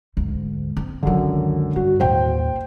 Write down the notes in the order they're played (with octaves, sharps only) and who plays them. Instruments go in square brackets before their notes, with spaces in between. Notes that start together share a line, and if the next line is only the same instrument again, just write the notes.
[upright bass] D2 G#2
C4
[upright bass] C#2 D#3 [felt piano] F#2 D3
[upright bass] G2 [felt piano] F#4
[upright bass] A1 D#2 [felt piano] C5 G5